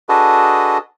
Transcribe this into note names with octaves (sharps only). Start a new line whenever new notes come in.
D4 F#4 G#4 A4 B4 D#5